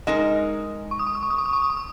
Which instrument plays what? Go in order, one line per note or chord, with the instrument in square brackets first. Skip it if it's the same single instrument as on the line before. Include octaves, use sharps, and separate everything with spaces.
[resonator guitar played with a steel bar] G#3 D#4 A#4 [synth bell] D#5
[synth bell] C#6
D#6
C#6
D#6
C#6
D#6
C#6
D#6
C#6
D#6
C#6
D#6